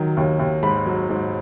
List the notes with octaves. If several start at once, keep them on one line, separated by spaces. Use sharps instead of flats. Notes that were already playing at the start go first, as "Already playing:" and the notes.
Already playing: D#3 F#3
D#2
D#2
G#2 B5
F#3
G#2